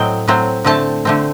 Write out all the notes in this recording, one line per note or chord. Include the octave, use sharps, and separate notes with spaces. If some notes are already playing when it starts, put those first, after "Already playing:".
Already playing: A2 F#3 C4 D#5 G5
A2 F#3 C4
D3 A3 C4 A5
D3 A3 C4